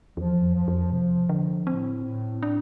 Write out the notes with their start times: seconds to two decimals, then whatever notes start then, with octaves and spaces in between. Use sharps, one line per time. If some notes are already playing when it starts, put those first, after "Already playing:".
0.17 E2 F3
0.42 F2
0.55 F3
0.68 F2
0.92 C3 F3
1.29 D3 F3
1.67 A2 C4
2.04 A2
2.42 A2 D4